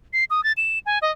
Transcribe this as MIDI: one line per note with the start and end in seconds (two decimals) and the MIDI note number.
0.13 0.24 96
0.30 0.43 87
0.44 0.52 93
0.57 0.79 100
0.86 0.99 80
1.02 1.11 75